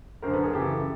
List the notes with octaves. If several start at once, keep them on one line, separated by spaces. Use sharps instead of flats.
F#2 D3 A#4 C5
A4 B4
G#4 A#4
F#2 C#3 E3 G4 A4